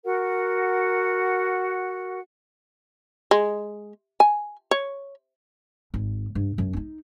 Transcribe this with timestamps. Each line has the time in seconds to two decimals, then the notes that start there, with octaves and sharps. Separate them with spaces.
0.04 F#4 A#4 F#5
3.31 G#3
4.20 G#5
4.71 C#5
5.94 G#1
6.35 G2
6.58 F#2
6.73 C#4 D#4